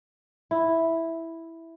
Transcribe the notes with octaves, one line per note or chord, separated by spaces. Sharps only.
E4